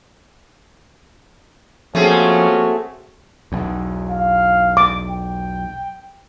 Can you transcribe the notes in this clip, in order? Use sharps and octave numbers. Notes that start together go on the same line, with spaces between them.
F3 A3 A#3 C4 C#4 F#4 G#4
B1 E2
F5
D6
G5